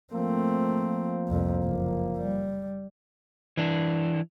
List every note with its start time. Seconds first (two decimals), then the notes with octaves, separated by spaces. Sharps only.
0.13 F3 A3 A#3 C4
1.28 C2 F2
1.64 F#1
2.17 G3
3.57 E3 D4